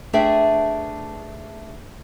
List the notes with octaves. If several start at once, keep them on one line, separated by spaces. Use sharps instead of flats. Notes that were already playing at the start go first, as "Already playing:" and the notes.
A3 D4 G#4 B4 E5 G5